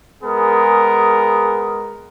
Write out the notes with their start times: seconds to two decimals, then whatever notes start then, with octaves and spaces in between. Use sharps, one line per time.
0.23 G#3 B3 G#4 A#4